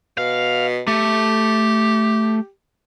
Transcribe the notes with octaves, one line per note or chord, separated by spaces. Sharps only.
B2 F5
A3 G4